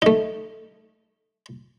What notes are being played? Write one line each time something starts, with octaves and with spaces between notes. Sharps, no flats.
A3 D#4